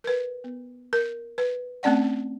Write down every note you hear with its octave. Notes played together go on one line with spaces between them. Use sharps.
A#4 B4
B3
A#4
B4
A3 C4 C#4 D5 F#5